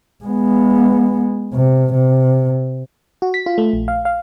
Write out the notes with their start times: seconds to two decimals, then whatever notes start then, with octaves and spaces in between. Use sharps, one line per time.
0.24 G#3 B3
1.54 C3
1.93 C3
3.22 F#4
3.34 B6
3.46 F4
3.58 A3
3.73 A#1
3.88 F5
4.05 F5